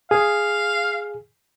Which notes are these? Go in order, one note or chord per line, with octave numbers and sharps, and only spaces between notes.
G#4 F5